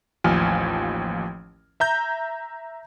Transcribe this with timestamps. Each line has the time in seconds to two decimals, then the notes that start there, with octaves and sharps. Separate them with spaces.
0.24 A1 D#2 F3 G#5 F6
1.80 E5 A#5 G6